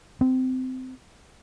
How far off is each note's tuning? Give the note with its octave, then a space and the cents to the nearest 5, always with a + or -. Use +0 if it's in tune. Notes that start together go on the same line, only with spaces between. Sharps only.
C4 -25